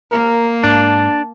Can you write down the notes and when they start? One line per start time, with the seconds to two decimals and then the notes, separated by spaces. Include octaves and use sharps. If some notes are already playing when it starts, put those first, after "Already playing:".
0.12 A#3 A#4
0.64 G#2 D4 A5